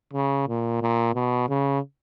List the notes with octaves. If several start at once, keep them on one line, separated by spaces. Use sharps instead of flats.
C#3
A#2
A#2
B2
C#3